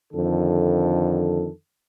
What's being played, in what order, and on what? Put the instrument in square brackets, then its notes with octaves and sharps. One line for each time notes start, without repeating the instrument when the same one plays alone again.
[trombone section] F2 D3 D#3 A4